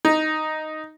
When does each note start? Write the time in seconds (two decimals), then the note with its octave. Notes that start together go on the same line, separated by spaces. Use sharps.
0.05 D#4